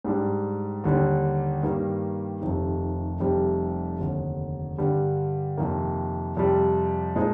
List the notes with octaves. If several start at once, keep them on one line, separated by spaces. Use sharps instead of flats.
G#2 G3 D4
D#2 D3 G3
G2 D#3 G3 A#3
F1 F2 C3 D#3
F1 F2 C3 G3
F1 D#2 D3
G2 D3 G3
F2 C3 D#3 A#3
F2 C3 G3
A#2 F3 G#3 D#4